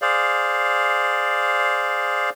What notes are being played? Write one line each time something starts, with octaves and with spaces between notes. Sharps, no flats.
G#4 C5 D5 F5